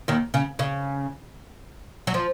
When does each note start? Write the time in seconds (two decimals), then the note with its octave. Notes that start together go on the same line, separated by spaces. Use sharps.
0.08 D#2 D#3
0.34 C#3
0.59 C#3
2.07 F#3
2.14 F3